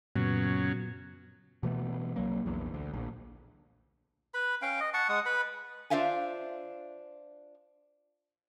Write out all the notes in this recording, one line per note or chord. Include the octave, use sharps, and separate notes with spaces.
F#2 A#2 C#3 F#3 B3
B2 E3 A3 B3
C2 F#3 A#3
A#1 E2
D2
A#1
B4 B5
C#4 F5 G5
D#5
F#5 A5 C#6
G#3 F#5 D#6
B4 B5
D4 F4 C5 E5 F5 G#5